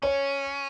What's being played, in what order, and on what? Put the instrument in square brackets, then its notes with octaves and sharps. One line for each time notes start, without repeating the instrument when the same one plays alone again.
[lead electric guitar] C#4 [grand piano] C#5